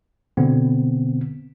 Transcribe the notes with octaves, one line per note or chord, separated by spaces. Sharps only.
B2 D3 B3 C4